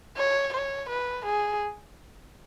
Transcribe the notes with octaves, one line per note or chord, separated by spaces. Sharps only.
C#5
C#5
B4
G#4